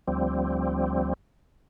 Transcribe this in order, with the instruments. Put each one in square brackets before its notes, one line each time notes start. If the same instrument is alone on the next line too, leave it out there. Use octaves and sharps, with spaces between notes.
[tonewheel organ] D2 F3 G3 C4